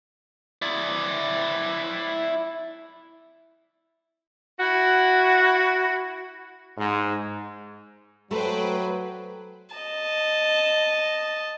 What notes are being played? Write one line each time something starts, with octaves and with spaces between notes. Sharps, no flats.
E4 D5
E4 F#4
G#2
F#3 A3 B4 C5 G5
D#5 A5